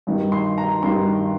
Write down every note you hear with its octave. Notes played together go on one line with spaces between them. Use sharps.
G2 D#3
C6
A#5
G2 D#3 C6